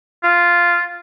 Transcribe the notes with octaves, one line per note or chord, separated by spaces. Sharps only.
F4